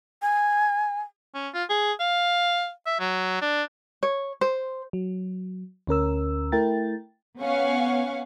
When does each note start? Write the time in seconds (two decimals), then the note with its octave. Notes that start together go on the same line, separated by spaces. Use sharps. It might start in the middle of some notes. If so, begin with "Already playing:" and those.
0.22 G#5
1.34 C#4
1.54 F4
1.70 G#4
2.00 F5
2.86 E5
3.00 F#3
3.41 D4
4.03 C#5
4.41 C5
4.93 F#3
5.87 D2 C#4 A#4 E6
6.52 A3 E4 A#4 G5 A6
7.40 B3 C#4 F5 F#5 G#5 C#6